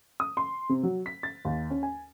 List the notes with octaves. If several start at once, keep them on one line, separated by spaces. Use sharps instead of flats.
D#6
C6
C3
F#3
B6
A6
D#2
C#4
G#5